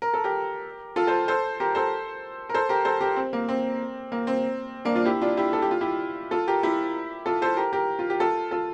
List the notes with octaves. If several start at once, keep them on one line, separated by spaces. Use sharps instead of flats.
A#4
A4
G4 A#4
F4 A4
A4 C5
A4 C5
G4 A#4
A4 C5
A#4
A4 C5
G4 A#4
A4 C5
G4 A#4
C4
A#3
C4
A#3
C4
A#3 D4
D4 F4
E4 G4
D4 F4
E4 G4
A4
G4
F4
E4 G4
F4 A4
G4 A#4
E4 G4
F4 A4
A4 C5
G4 A#4
G4 A#4
F4
G4
F4 A4
F4 A4